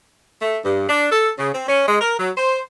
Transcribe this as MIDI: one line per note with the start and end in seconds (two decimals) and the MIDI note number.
0.42 0.58 57
0.64 0.89 43
0.89 1.06 62
1.11 1.30 69
1.38 1.52 49
1.54 1.67 60
1.68 1.86 61
1.87 1.99 56
2.01 2.17 70
2.19 2.31 54
2.37 2.60 72